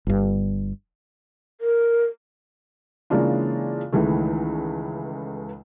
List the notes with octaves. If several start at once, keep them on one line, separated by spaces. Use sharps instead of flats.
G1 G2
A#4
C#3 E3 G#3 A#3 D4 F4
C#2 D#3 E3 G#3 A3